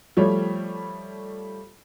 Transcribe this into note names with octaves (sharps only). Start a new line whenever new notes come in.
F3 G3 A3 C#5